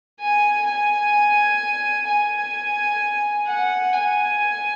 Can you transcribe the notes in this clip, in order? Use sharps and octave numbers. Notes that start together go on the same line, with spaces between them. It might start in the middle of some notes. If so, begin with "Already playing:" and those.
G#5
G#5
G#5
F#5
G#5